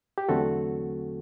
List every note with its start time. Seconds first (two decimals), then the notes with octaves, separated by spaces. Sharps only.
0.18 G4
0.29 E2 D3 F#3 A3 C4 F#4 A4